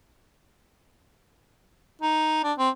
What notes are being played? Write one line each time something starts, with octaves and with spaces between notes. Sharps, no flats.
D#4
D4
C4